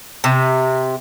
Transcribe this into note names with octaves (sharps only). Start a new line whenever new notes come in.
C3